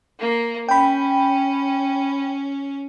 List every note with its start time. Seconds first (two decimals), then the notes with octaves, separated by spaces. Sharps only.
0.20 A#3
0.69 C#4 G5 B5